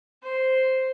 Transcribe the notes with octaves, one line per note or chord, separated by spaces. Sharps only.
C5